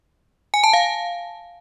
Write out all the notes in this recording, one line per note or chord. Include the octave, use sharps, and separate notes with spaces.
G#5
A5
F5